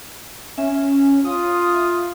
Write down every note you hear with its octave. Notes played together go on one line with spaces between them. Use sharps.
C#4 E5
F4 D#6